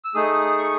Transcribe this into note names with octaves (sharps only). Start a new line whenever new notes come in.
E6
A3 D#4 G#4 D#6
C#6